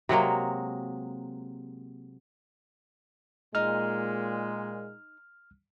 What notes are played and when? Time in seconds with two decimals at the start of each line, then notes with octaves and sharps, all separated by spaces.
0.09 C3 F#3 G#3 A#3
3.55 A#2 G#3 D#4 F6